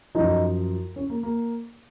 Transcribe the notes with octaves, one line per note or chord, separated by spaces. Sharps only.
F#2 F3 D#4
C#4
A#3
A#3